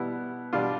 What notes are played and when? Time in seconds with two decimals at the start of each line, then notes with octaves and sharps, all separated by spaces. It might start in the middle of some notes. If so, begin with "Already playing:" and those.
Already playing: B2 G3 B3 E4
0.53 B2 G3 D4 F4